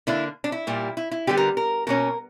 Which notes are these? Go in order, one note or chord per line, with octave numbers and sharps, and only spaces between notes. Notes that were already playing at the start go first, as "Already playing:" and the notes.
D3 A#3 D4 E4
D4
E4
A#2 G3 A#3
E4
E4
D3 G3 B3 G4
A#4
A#4
B2 A#3 C#4 A#4